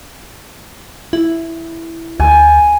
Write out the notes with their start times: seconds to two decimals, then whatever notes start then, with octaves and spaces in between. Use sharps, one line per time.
1.13 E4
2.20 D2 G#5